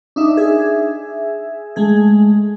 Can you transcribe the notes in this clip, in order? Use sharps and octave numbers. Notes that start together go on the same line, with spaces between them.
D4 D#4 E5
G#4 E5
G#3 A3 G#4